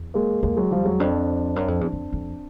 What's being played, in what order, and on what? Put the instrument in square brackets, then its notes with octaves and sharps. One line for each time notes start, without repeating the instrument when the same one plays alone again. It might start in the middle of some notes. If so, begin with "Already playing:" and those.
Already playing: [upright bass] E2
[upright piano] G#3 A#3
[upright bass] E2 [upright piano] G#3 A#3
[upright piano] F#3 G#3
F3 G3
F#3 G#3
[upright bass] F2 [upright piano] C4 D4
[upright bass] F#2
F2
E2
F2
F2